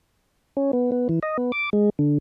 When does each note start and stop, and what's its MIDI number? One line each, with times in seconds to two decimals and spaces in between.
0.57 0.71 61
0.73 0.91 59
0.92 1.08 59
1.09 1.19 52
1.23 1.37 75
1.37 1.52 59
1.52 1.70 86
1.73 1.90 56
1.99 2.18 50